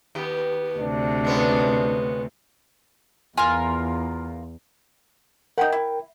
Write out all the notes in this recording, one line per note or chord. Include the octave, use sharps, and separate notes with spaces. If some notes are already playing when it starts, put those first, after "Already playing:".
D#2 B3 G4
D2 C3 D4
G#3 B3 C#4
E2 F4 A#4 G#5
D#4 A#4 F#5 G5
E4